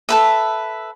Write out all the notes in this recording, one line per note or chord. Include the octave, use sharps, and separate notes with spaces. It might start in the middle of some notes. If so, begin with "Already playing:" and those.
A4 B4 E5